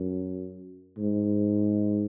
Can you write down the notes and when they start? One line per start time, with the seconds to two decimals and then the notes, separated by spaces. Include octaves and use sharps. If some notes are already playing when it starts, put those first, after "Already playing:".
Already playing: F#2
0.98 G#2